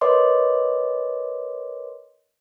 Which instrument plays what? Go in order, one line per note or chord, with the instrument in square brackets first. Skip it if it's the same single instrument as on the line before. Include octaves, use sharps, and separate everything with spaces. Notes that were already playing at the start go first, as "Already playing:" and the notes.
[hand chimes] A#4 B4 C#5 D#5 C6 D6